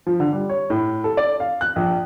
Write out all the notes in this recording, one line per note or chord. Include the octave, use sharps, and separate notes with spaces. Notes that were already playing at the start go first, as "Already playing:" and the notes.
F3
D3
G3
C#5
A2
A4
D5
F5
F#6
A#1